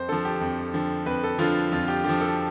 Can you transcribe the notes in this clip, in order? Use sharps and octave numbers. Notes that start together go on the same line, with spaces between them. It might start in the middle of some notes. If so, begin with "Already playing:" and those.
Already playing: F2 C5
D3 F3 A4
G4
F2
D3 F3
F2 B4
A4
D3 F3 F4
F2 F4
G4
D3 G4
F3
A4